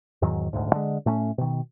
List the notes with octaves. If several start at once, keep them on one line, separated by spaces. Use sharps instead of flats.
E2 G#2 D#3 F#3
D#1 D2 G#2
D3 G#3
A2 A3 B3 C#4
B2 D#3